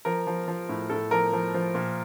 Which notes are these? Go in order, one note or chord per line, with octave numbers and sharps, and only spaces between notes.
F3 A#4
F3
F3
A2
A2 A4
F3 A#4
F3
F3
A#2